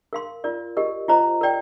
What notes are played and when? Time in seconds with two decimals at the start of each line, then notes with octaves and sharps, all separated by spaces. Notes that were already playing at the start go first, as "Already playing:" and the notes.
0.13 A#4 F5 C6
0.44 F4 A#4 D5
0.77 G4 A#4 D#5
1.08 F4 C5 D#5 A#5
1.41 A#4 D5 G5